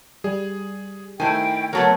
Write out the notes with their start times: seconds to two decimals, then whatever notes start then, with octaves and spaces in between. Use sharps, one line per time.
0.24 G3 G#4
1.20 D#3 A3 E4 C5 G5 G#5
1.73 F#3 A3 B3 F#4 A#4 C#5